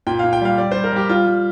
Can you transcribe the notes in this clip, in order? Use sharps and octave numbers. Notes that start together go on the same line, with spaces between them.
A#2 G5
A#2 F5
G5
G3 F5
G3 D5
G3 C5
A#4
G3 G4
G3 F4
G3